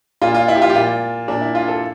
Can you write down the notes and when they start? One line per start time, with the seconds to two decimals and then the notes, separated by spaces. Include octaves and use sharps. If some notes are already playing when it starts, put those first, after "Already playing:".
0.22 A#2 F4
0.35 F4
0.48 E4
0.55 G4
0.62 F4
0.70 G4
0.75 A#2 F4
1.28 A#2 D4
1.41 E4
1.55 F4
1.68 A4